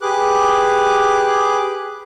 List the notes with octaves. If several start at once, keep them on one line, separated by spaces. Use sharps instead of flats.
G4 G#4 B4 D6 F#6